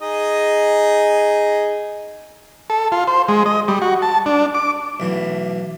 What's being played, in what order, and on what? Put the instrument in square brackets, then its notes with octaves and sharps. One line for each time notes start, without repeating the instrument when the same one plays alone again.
[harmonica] D#4 G#4 D#5
[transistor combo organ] A4
F4
C5
G#3
D#5
G3
F#4
A5
D4
D6
[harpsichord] B1 E3 A3